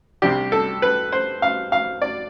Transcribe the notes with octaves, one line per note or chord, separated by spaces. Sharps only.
C2 C3 G3 D4 G4
A4
B4
C5
F5
F5
D5